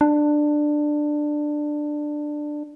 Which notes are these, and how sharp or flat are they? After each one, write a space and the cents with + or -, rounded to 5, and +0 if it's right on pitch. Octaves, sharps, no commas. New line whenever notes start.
D4 +15